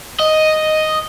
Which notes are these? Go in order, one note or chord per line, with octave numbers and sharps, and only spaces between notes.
D#5